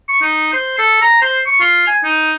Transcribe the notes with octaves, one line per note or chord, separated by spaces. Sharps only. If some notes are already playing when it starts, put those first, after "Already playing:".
C#6
D#4
C5
A4
A#5
C5
C#6
F4
G#5
D#4